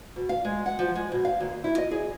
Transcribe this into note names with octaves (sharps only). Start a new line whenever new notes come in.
B2
F5
G#3
F#5
F3
G#3
B2
F5
D#2
E4
D#5
G#4